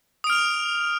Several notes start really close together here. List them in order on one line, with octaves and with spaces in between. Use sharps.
D#6 D7 F6 F7